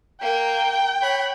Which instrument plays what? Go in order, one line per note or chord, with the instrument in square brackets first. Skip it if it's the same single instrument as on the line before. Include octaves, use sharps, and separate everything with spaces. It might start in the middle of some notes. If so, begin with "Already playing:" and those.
[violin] A#3 A#4 [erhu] G5
[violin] C#5 B5